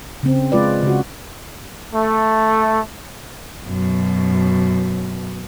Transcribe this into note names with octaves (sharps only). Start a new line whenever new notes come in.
C#3 C4
G#3 F4 B4 D5
C#3 F#4
A3
F#2 B2